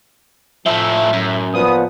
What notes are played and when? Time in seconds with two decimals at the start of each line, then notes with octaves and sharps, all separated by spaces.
0.66 A2 F3 A3 E5
1.13 F#2
1.54 A#2 F3 B3 D#6